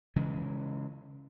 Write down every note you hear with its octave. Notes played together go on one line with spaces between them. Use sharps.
C#3 E3 G#3